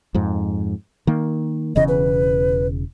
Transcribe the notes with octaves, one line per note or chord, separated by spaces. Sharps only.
F2 G#2
D#3 A#3
E1 E2 C#3 D#5
B4